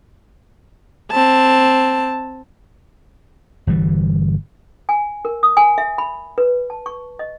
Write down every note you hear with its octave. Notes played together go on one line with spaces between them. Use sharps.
C4 A5
G1 E3 G3
G#5
A#4
D#6
G#5
E5
B5
B4
A5
C#6
D#5